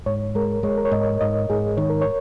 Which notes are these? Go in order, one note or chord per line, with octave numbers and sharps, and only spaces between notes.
G#2 C#5
G#3 A#4
G#3 C#5
A#4
C#5
G#2 D#5
G#2 D#5
G#2 G#4
D#3 C#5
A#4
C#5